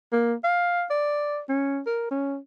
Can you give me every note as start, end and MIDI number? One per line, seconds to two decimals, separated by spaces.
0.13 0.34 58
0.44 0.85 77
0.90 1.39 74
1.49 1.80 61
1.86 2.08 70
2.11 2.37 61